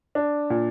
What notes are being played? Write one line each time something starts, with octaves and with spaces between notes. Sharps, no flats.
D4
A#2